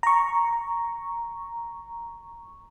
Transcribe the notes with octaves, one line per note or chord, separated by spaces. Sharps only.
A#5 C#6